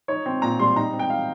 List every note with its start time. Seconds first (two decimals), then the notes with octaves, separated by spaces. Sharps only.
0.08 D#4 C#5
0.26 C4
0.42 A#2 A#5
0.60 G3 C6
0.76 D#4 A#5
0.93 C4
0.99 G5
1.10 F5